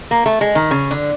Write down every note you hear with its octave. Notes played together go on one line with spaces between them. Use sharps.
A#3
A3
G#3
D#3
C#3
D3